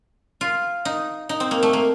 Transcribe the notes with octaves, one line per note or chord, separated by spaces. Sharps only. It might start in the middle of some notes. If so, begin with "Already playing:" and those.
F4
D#4
D#4
C4
A#3
A3
A#3